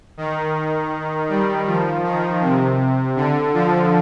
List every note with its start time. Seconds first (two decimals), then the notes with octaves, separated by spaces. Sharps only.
0.17 D#3
1.29 G3
1.67 F3
2.04 D#3
2.41 C3
3.16 D3
3.53 F3